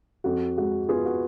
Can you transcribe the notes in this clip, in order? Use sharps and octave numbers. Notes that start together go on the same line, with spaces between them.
F2 F#4
G#3 F#4
B3 F4 G#4
F#4